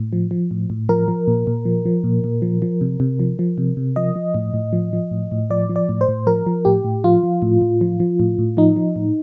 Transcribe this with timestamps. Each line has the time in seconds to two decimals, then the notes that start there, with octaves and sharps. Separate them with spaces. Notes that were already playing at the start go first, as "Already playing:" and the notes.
Already playing: A2
0.13 F3
0.31 F3
0.51 A2
0.70 A2
0.89 F3 A#4
1.08 F3
1.28 A#2
1.47 A#2
1.65 F3
1.85 F3
2.04 A#2
2.24 A#2
2.42 F3
2.62 F3
2.81 C3
3.00 C3
3.19 F3
3.39 F3
3.58 C3
3.77 C3
3.96 F3 D#5
4.16 F3
4.34 A2
4.54 A2
4.73 F3
4.93 F3
5.11 A2
5.32 A2
5.50 F3 D5
5.69 F3
5.76 D5
5.89 A2
6.01 C5
6.08 A2
6.27 F3 A#4
6.46 F3
6.65 A2 G4
6.85 A2
7.04 F3 F4
7.23 F3
7.42 A2
7.61 A2
7.81 F3
8.00 F3
8.20 A2
8.39 A2
8.57 F3 D#4
8.76 F3
8.96 A2